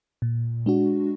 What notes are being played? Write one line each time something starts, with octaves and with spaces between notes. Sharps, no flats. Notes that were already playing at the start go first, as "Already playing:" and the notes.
A#2
G#3 D4 F#4